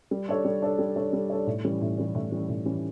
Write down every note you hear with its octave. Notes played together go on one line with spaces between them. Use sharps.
G3
D4 A4 C#5
G3
D4 A4 C#5
G3
D4 A4 C#5
G3
D4 A4 C#5
A2
E3 G3 C#4
A2
E3 G3 C#4
A2
E3 G3 C#4
A2
E3 G3 C#4